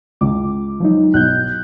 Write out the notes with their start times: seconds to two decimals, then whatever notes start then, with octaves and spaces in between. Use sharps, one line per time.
0.21 C#2 D6
0.80 F3 F#3 D#4
1.14 B1 F#6 G6